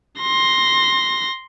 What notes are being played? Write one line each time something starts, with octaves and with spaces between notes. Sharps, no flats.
C6 A#6